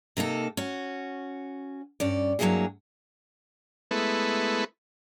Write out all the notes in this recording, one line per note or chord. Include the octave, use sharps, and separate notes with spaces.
C3 A#3 D#4 A4
C#4 F#4
G2 C#4 D5
G2 F#3 G3 A#3 E4 G#4
G#3 A3 B3 E4 A4 B4